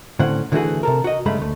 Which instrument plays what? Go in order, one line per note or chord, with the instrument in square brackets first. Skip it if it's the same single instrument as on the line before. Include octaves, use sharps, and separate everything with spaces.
[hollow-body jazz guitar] A2 D3 C4 C#4 F#5
D3 E3 A3 C4 F#4 G#4
C3 A4 A#4
F#4 D#5
G2 C#3 G#3 A3 B5
D2 A3